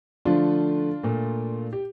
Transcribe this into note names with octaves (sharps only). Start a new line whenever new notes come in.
D3 F3 A3 D4 F4
A#2 A3
G4